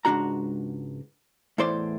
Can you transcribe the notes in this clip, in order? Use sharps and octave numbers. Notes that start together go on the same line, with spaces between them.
C#2 G#2 B2 D4 F#4 A#5
E2 A2 E3 C5 D5 C6